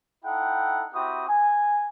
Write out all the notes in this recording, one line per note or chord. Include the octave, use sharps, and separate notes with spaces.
D#4 E4 A4 F#5 G5
C4 E4 F#4 G4 D#6
G#5